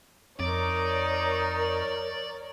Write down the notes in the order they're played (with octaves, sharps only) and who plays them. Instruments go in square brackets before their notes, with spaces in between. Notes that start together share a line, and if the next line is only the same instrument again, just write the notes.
[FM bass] F2 [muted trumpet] D#4 [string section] A#4 C#5 [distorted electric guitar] D5